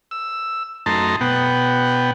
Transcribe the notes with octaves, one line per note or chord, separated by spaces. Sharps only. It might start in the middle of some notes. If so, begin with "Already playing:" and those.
E6
F#2 A3 D#4 A5 A#5 C6
B2 B3 F#5 G5